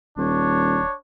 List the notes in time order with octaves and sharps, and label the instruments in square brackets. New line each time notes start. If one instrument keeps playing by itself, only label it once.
[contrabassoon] D#1 [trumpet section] D4 C#5